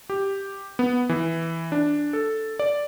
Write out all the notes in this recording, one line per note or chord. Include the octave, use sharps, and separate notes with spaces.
G4
B3
E3
D4
A4
D5